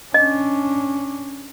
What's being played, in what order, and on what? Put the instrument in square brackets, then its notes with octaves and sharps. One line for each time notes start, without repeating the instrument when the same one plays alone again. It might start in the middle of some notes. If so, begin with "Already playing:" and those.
[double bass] C#4 D4 [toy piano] D#5